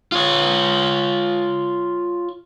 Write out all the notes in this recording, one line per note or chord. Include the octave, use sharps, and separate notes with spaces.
F4 C#5